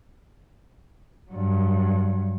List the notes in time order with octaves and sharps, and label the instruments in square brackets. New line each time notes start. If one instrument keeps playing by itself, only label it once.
[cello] G2 F#3